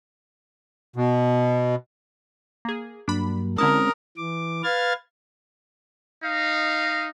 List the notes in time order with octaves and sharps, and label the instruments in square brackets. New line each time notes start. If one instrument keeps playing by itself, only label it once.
[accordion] B2
[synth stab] A#3 G#4
[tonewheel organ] G2 F#3 A#3 [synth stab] D4 B5
[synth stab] D3 E4 A5 [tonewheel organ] G#3 C4 C#4 [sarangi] A#4 [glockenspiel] D#6
[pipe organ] E3 D6
B4 F5 F6 G#6 A6
[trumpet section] D#4 D#5 F5